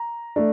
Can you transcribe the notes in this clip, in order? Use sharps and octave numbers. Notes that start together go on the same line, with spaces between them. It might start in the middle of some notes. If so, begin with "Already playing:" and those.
Already playing: A#5
A3 D4